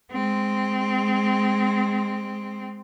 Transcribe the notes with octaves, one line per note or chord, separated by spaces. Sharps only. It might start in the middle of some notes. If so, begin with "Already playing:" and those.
G#3 C4